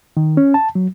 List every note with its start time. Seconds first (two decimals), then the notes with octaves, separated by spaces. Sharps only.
0.17 D#3
0.37 C#4
0.54 A5
0.75 F#3